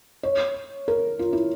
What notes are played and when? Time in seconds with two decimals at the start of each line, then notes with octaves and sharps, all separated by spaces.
0.23 C#5
0.88 A#4
1.19 F4
1.33 E4